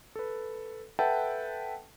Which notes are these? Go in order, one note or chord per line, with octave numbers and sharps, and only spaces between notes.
A4 B4
A4 B4 E5 F#5 G5 A5